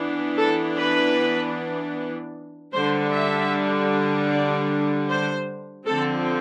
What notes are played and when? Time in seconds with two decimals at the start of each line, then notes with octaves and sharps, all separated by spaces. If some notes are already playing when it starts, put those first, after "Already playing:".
Already playing: E3 B3 D4
0.38 A4
0.77 B4
2.73 D3 G3 D4 C5
3.12 E5
4.30 D5
5.08 C5
5.86 D3 F3 C4 A4